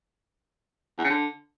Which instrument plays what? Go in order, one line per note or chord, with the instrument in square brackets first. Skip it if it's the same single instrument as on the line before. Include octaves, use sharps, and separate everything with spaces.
[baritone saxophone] E2
C#3
D3